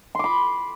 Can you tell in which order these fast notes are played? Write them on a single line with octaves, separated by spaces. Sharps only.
C6 D6 B5